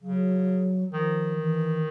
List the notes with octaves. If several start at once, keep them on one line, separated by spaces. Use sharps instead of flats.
C#3 F#3
D#3 F3
E3